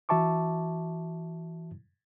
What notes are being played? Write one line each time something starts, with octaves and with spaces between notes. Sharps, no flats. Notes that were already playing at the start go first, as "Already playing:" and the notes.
E3 F#4 E5 A5 C#6 D6